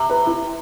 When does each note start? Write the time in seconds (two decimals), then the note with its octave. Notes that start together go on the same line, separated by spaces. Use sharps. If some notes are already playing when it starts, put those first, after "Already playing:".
Already playing: C3
0.10 B4
0.26 E4